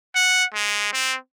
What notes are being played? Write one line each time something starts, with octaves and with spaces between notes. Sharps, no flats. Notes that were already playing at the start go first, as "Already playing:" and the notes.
F#5
G#3
C4